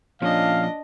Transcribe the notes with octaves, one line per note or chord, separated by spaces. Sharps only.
A#2 F3 C#4 D4 D#5 F5